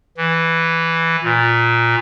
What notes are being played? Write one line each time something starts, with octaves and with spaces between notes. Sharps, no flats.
E3
A#2